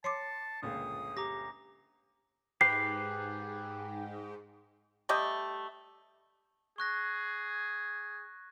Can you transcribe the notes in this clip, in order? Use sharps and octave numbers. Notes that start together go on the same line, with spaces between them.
C#5 A5 C6 D6 C7 C#7
G1 C#2 A#2 D#6
G4 A#5 D6 A#6
G#2 G4 B4 C7
G3 A3 G4 D#5
G#4 C#6 F#6 A#6